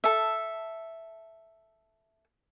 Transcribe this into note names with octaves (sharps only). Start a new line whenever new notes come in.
A4 E5